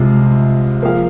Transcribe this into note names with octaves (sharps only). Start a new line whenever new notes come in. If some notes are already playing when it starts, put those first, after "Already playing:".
Already playing: C2 C3 G#3 F4
F3 A#3 G#4 F5